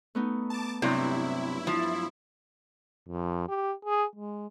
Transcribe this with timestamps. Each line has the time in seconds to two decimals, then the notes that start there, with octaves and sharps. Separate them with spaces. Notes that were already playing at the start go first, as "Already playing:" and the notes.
0.15 A3 B3 D#4
0.50 A5 D6
0.82 G2 C3 F#3 E4 D#5
1.67 F3
3.09 F2
3.49 G4
3.85 G#4
4.15 G#3